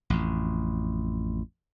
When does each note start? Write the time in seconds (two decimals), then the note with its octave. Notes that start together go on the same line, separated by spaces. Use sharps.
0.10 A1 F2